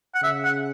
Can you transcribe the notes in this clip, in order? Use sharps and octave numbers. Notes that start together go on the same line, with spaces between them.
F#5
C#3 E5
F#5